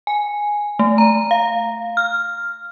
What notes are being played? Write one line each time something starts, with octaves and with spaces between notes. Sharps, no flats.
G#5
A3
A#5
F5
F6